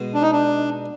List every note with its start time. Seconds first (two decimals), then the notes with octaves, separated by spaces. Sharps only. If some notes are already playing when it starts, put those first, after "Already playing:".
Already playing: B2 G#3
0.14 D4
0.22 D#4
0.32 D4